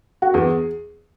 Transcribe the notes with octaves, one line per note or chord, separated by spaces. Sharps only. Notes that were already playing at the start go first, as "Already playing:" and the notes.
F#4
E2 G#4